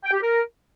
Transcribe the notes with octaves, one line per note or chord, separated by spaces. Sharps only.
G5
G4
A#4